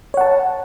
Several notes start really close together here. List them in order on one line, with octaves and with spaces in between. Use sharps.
C#5 F#5 A5